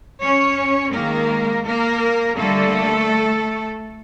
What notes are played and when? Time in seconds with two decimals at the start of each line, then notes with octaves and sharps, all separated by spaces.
0.22 C#4 C#5
0.93 D#3 G#3 A#3 A#4
1.65 A#3 A#4
2.37 D3 G3 A3 A#3 A4